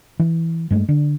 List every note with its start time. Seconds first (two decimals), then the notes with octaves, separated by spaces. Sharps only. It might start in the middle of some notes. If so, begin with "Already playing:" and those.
0.19 E3
0.71 G2 G#3 A3
0.89 D3